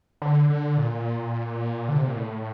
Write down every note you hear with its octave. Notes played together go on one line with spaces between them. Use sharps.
D3
D3
A#2
D3
C3
A#2
A2